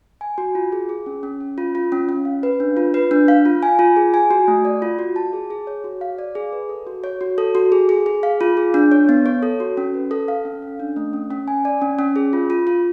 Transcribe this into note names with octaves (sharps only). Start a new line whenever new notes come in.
G#5
F#4
F4
G#4
G#4
C#4
C#4
C#4
F4
F4
C#4
C#4
F5
B4
D4
F4
B4
D4
F5
F4
G#5
F4
G#4
G#5
F#4
A3
D5
F4
F#4
A5
G#4
G#4
C#5
F#4
F5
D5
G#4
B4
A4
F#4
C#5
F#4
A4
F#4
G#4
G#4
G#4
F5
F4
G#4
D4
C#5
B3
C#5
A4
F#4
C#4
B4
A4
F5
C#4
C#4
D4
A3
C#4
C#4
G#5
D5
C#4
C#4
G#4
F4
F4
F4